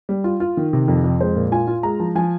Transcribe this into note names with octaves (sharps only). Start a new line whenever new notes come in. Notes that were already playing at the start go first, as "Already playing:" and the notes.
G3
F4
F4
D#3
C3
F2
F2
G#3 C5
A#2
F4 G#5
F4
G#3 A#5
F3
F3 G#5